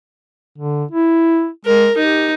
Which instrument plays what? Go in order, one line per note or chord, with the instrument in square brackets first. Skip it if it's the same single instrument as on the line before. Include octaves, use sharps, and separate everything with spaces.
[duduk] D3
E4
[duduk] G#3 [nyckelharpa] A#4
[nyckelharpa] D#4 [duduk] G4